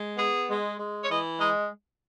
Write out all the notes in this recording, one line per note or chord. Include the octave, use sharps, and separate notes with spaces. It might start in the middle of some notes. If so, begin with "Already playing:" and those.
Already playing: G#3
B3 G#4
G#3
G#3
C#5
E3 D#5
G#3 D#5